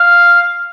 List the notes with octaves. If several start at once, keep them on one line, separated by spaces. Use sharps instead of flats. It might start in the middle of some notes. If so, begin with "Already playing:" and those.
Already playing: F5